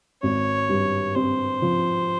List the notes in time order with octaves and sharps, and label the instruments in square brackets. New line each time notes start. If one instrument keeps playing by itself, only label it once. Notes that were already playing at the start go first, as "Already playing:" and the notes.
[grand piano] G#1 [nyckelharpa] C#5
[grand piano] G2
[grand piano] C4 [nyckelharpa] C5
[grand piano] F3